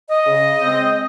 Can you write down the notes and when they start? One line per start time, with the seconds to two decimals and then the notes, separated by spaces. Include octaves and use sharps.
0.09 D#5
0.26 C#3
0.61 G#3 C4